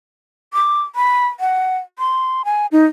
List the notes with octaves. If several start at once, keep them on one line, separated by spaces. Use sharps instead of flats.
D6
B5
F#5
C6
G#5
D#4